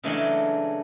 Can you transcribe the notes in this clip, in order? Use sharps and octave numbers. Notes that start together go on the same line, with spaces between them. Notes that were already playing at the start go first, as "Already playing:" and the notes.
C#3 E3 F#3 G#3 A3 D4